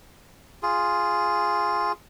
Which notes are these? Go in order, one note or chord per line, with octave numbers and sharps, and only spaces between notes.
F4 G#4